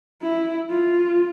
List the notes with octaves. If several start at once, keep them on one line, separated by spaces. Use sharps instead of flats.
E4
F4